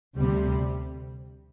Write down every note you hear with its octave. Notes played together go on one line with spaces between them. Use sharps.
D2 C3 G3